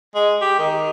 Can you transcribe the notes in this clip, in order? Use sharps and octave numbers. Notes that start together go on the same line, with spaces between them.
G#3
G4
D#3